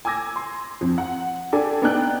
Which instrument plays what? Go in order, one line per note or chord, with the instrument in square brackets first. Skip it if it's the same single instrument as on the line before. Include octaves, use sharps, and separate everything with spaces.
[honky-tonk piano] G#5 D6 E6 G#6 A#6
C6
F2
F#5
D4 G4 A4 D5 G#5
B3 D4 D#4 G5 F#6